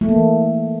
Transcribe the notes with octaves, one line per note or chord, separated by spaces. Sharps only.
A3
A#3
E3